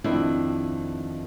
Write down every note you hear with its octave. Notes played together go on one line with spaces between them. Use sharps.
F2 D#3 D4 E4